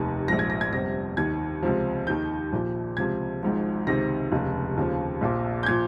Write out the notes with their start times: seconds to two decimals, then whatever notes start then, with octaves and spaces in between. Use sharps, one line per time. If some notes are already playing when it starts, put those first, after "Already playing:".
Already playing: F1 D#2 D#3
0.28 A#1 G#2 F3 A#6
0.39 G#6
0.50 A#6
0.61 G#6
0.72 G1 F2 C3 A#6
1.17 D#2 D#3 G#6
1.63 C#2 C3 F3
2.07 D#2 D#3 G6
2.52 A#1 A#2 F3
2.97 C#2 C3 F3 G#6
3.43 G#1 G#2 F3
3.87 C#2 C3 D#3 A#6
4.31 F1 D#2 C#3
4.77 D#2 C#3 F3
5.21 A#1 A#2 F3
5.63 G6
5.66 A#2 F3 G#6